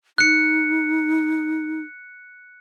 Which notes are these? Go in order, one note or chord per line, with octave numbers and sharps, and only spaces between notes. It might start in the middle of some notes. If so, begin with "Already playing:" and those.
D#4 F#6 C#7